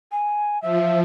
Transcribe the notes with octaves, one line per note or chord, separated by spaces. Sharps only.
G#5
F3 E5